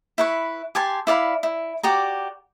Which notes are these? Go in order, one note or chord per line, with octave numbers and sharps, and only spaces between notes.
E4 B4 C#6
G4 G#5 A5 C6
E4 D5 F5 B5
E4
F#4 G4 D5 A#5